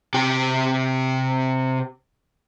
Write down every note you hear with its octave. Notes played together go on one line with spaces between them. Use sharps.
C3 G4